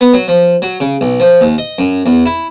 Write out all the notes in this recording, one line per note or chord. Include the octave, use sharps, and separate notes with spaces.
B3
F#3
F3
F#3
C#3
B1
F3
D#2
D#5
F#2
E2
E4